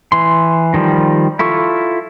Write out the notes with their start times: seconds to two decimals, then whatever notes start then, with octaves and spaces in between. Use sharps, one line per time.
0.12 E3 C6
0.74 D#3 F3 G3
1.39 E4 F4 A4 C#6